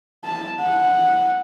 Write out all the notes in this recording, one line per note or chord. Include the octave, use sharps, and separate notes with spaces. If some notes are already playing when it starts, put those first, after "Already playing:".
A5
F#5